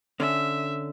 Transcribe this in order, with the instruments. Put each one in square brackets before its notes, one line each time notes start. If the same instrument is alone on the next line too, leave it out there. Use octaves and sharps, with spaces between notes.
[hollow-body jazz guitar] D3 C#4 [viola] E5